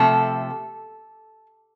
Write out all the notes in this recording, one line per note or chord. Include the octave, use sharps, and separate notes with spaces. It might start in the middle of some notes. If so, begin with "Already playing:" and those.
Already playing: C3 F3 A3 A4